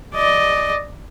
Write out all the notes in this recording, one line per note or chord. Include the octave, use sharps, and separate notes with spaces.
D5 D#5